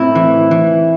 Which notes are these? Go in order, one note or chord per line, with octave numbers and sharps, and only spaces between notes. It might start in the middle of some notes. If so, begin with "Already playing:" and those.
Already playing: A2 C4 E4
E3
E3